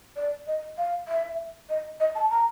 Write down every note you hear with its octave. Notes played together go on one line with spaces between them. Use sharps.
D5
D#5
F5
E5
D#5
D#5
A5
A#5